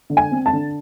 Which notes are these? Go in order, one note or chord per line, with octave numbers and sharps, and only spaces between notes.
D3
G#5
C4
A5
D3